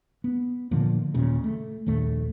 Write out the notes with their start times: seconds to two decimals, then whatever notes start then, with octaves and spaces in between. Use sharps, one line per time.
0.24 B3
0.71 A#2 D3 F3 A#3
1.14 D#1 D#2 A#2 C#3
1.44 A3
1.86 A#1 D#2 A3